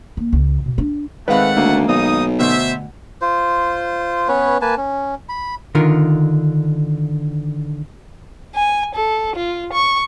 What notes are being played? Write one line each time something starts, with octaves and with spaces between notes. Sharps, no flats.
A#3
C#2
B2
D4
D#3 G#3 A3 C4 B4 F5 F#5 B5
D2 A#3
B1 D#4 D#6
D2 B2 C5 E5
F4 C5
B3 C#4 B4 C#5
A#3 B4 G#5 A5
C#4
B5
D3 D#3 F4 A#4
G#5
A4
F4
C#6